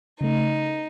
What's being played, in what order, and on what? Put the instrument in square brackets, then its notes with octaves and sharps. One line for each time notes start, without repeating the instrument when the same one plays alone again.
[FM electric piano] C#3 A3 [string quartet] D#4